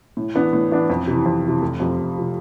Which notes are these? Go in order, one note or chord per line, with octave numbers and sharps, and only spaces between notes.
A2
E3 B3 D4
A2
E3 B3 D4
F2
C3 E3
F2
C3 E3
F1
F2 C3 F3
F1
C3 F3